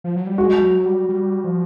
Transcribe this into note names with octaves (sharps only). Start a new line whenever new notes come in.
F3
F#3
G3
G#3 F#4
F#3
G3
G3
F3